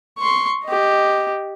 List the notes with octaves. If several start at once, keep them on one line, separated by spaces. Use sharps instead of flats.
C6 C#6
G4 D#5